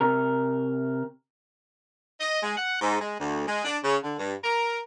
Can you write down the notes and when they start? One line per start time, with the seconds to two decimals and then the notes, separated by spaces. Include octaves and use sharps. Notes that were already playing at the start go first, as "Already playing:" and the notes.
0.01 C3 A#4
2.20 D#5
2.43 G#3
2.57 F#5
2.81 G#2
3.01 G#3
3.19 D2
3.47 G#3
3.65 D4
3.84 C#3
4.04 D3
4.19 G2
4.43 A#4